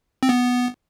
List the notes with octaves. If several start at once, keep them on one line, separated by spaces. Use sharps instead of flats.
C4
B3